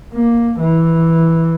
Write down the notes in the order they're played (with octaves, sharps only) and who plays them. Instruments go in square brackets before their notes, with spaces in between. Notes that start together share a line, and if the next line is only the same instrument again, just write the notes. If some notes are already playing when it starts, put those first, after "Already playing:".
[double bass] A#3
E3